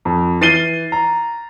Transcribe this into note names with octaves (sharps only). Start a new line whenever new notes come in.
F2
E3 A6 C7 D#7 G7
A#5